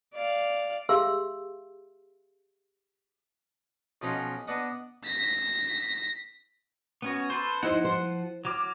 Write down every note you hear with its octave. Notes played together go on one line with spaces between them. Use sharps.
D5 F5
G4 G#4 E5 F5 C6 E6
B1 F3 C#4 D#4 F#5 C6
B3 D4 D#5 F#5
A#6 B6
B3 C#4 F#4
A4 B4 C5
F3 D#4 E4 C5 F#5
C5
F#3 D6 F6